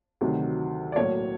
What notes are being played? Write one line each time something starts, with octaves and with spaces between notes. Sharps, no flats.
D2 C3 D#3 F#3
D5
B1 A2 F#3 A#3 C#5